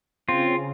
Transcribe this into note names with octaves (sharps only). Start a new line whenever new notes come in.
C#3 C4 F4